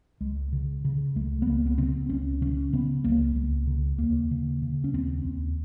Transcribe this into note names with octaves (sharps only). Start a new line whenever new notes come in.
C#2 G#3
C#3
C#3
C#2 A3
B3
C#2 A#3
B3
C#3 C4
C#2 C#4
C#3 C#4
C#3 B3
C#2 A#3
C#2
C#3
D#2 A#3
C#3
C#3
C#4
D#2 C4
D#2